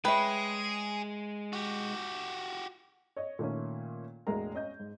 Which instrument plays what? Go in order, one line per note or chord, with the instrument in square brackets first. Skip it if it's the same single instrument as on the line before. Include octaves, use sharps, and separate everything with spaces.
[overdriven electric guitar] G#3 [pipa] C#4 B4 [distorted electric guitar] G#4 [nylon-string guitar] E5 G5
[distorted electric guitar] F#4 G4
[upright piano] C#5 D#5
A#2 D#3 A3 C#4
E1 A2 G#3 A#4 A#5
C#4 D#5 G6
G#2